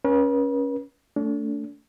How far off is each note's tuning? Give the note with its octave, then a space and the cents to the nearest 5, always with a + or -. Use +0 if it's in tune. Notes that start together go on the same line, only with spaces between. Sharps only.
C#4 +0 B4 -45
A3 +15 D4 -35